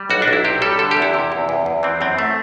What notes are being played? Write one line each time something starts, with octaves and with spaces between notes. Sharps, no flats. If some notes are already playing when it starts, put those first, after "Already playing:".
Already playing: G3
B1 F#4
D4
B1
E4
C3 G4
G3 A4
D3 A4
G4
E2
E4
C3
E2
E2
E2
E3 C4
F#2 C4
A3